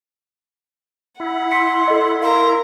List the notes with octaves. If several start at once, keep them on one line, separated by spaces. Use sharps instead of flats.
E4 F#5
C6 B6 C#7
A4 D#5
A#4 F5 A#5 C6